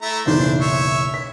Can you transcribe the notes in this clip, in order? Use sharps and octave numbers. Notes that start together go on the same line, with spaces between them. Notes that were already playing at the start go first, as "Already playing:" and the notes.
A3 E4 A#5
F#1 B1 E3 D4 C5
C#5 E5
B6